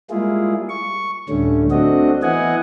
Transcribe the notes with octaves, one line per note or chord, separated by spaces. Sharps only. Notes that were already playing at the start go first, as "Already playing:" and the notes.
G3 G#3 A#3 E4 F4 G#4
C#6
D2 A2 D3 G3 A3 C#4
A3 C4 D4 F#4 D#5
E3 B3 E4 D#5 F#5 G#5